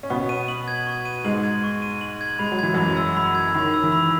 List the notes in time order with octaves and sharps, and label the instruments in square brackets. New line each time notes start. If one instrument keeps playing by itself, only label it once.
[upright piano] C#4
[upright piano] B2 B3 [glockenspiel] C#6
[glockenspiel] D#7
F#7
G#6
C#6
D#7
[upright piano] G#2 G#3 [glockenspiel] F#7
[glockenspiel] G#6
C#6
D#7
F#7
G#6
[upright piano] G#3 [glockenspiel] B5
[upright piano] F#3
[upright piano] E3 [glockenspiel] G#6
[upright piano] F#2 F#3 [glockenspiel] B5
[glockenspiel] E6
B5
G#6
[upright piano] D#3 [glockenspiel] B5
[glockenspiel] E6
[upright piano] E3
[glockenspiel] B5